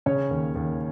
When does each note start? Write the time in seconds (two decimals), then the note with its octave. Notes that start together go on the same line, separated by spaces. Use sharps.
0.06 C#3 C#4 C#5
0.31 D#2
0.56 D#2